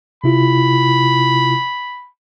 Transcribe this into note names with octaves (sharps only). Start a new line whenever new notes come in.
C3 E4 F4 B5